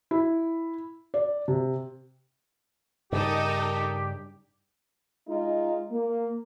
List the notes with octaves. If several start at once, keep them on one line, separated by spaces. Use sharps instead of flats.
E4
D5
C3
G2 C#3 G3 D#4 G4 A4 A#4
G#3 D#4 F4
A#3